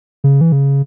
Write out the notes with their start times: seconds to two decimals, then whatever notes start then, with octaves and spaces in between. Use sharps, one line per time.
0.24 C#3
0.41 E3
0.52 C#3